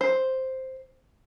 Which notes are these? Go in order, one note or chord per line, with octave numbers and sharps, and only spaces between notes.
C5